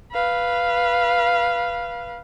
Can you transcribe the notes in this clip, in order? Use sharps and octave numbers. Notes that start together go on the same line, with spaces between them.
B4 F5